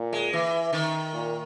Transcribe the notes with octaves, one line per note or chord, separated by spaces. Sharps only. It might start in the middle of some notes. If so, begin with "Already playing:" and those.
Already playing: A#2
G#3
E3
D#3
A#2